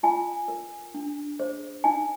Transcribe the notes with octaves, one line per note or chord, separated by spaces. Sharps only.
F4 G#5
A#4
D4
G#4 C5
D#4 G#5